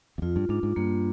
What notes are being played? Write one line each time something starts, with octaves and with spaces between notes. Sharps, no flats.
E2
F2 F4
G2
G#2 D4
G#2
G2 A#3